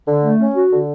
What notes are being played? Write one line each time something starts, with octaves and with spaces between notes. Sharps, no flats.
D3
A3
C#4
F#4
D3